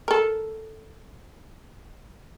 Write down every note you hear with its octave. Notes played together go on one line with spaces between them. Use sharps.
A4 A#4